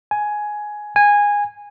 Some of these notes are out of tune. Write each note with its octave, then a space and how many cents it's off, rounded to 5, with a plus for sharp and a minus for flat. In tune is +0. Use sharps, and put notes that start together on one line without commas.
G#5 +10
G#5 -15